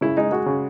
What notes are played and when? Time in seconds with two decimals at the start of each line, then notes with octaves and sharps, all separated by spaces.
0.01 C#3 E4
0.17 G#3 D#4
0.31 G#3 F#4
0.46 C#3